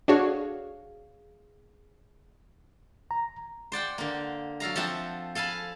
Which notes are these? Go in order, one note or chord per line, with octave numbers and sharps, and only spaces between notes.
D4 F#4 G#4 C#5 F5
A#5
C5 D5 F#5 G5
D3 A#3
F#3 A4 F5 A#5
F3 C4 A4 E5 F#5
A4 F5 G#5 A5 B5